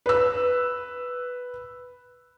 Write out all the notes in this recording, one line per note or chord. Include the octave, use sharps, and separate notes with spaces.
B4 E6